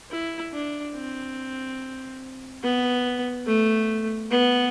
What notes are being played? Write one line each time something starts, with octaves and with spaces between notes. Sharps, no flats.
E4
D4
C4
B3
A3
B3